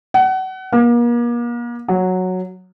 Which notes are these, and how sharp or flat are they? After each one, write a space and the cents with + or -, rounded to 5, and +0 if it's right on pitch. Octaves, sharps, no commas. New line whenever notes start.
F#5 +30
A#3 +40
F#3 -5